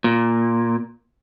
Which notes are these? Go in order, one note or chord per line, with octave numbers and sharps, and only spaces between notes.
A#2